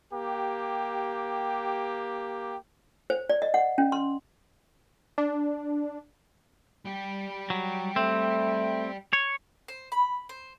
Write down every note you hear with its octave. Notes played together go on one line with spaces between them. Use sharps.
A#3 G4
C5
D5
D#5
F#5
C#4
C6
D4
G3 G4
F#3
A3 C4
C#5
C5
B5
C5